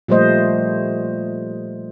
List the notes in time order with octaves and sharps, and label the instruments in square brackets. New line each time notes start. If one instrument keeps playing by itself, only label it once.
[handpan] A#2 F3 G3 A3 C5 D#5